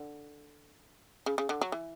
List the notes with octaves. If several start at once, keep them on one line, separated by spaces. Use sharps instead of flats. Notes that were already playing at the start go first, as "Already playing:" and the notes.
Already playing: D3
C#3
C#3
D3
F#3
E3